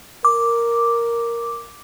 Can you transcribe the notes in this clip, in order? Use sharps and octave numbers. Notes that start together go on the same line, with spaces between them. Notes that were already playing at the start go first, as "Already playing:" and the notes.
A#4 D6